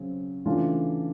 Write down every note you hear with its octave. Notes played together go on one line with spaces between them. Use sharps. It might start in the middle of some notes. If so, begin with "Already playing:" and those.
Already playing: C#3 F#3 C4
C#3 E3 A3 D4 F4